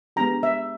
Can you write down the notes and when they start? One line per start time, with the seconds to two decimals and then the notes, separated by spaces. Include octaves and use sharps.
0.16 G#3 B3 D4 G4 A#5
0.43 E5